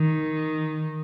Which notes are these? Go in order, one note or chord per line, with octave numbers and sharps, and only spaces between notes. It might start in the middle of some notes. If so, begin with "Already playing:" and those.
Already playing: D#3